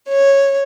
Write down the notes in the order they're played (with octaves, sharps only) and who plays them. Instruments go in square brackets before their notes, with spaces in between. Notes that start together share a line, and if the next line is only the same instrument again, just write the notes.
[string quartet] C#5